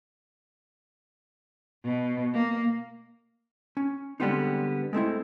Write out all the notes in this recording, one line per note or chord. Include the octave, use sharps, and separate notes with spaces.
B2
A#3
C#4
D3 G3 G#3 B3 C4 D#4
G#3 A3 C4 E4